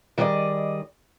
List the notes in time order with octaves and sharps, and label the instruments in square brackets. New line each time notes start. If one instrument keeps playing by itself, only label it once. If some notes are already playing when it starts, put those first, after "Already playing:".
[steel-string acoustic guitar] D#3 G3 G#4 A4 D5 D#5